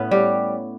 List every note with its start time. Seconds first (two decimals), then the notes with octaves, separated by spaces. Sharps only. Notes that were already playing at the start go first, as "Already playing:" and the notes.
Already playing: A2 B3 C#4 B4
0.11 G3 G4